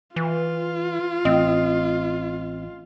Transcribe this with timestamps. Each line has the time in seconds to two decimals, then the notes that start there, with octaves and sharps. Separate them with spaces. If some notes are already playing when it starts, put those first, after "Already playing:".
0.16 E3 F4
1.25 A1 C4 D#5